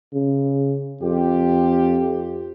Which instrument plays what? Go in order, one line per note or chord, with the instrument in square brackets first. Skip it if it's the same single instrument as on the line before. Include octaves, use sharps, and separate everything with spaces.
[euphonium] C#3
[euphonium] F2 [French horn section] F4 G4